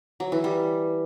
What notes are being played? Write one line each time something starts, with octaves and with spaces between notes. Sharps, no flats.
F#3
E3
G3